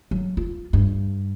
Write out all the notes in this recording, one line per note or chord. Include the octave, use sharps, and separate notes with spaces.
F#3
F4
G2